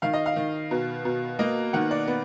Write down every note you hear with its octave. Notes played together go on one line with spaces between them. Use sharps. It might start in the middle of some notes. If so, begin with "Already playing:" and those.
D#3 F5
D#5
F5
D#3
B2
B2
A#3 D#5
D#3 F#5
D5
B3